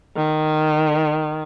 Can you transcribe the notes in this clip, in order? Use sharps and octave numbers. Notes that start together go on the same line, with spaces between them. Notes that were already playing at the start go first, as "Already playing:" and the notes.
D#3